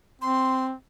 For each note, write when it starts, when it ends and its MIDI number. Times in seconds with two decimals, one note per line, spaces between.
0.22 0.73 60
0.22 0.66 84